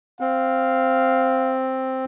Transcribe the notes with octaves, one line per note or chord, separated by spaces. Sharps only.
C4 F5